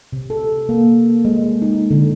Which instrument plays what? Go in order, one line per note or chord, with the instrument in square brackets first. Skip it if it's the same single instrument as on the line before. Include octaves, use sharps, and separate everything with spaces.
[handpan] C3
A4
A#3
G#3
D#4
D3